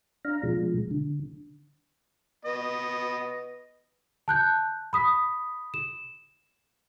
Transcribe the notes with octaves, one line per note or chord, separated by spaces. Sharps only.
D4 F5 A#5
B2 F3 G#3
D3
B3 D#5
A5 F#6 G6
B5 D#6 B6
E7